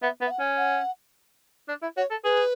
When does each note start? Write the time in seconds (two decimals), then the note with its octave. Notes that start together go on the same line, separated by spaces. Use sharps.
0.02 B3 E5
0.21 B3
0.26 E5
0.31 F#5
0.39 C#4
0.57 F#5
1.68 D4
1.82 E4
1.97 F#4 C#5
2.10 A4
2.24 G#4 B4